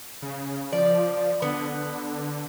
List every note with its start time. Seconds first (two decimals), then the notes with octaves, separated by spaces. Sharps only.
0.22 C#3
0.72 F3 D5
1.42 D3 B3